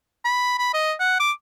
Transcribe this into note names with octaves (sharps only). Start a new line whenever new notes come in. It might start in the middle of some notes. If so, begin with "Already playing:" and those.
B5
B5
D#5
F#5
D6